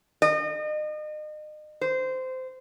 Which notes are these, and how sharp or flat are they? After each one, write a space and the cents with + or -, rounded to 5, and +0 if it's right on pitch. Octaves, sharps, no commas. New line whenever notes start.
D#5 -35
C5 -20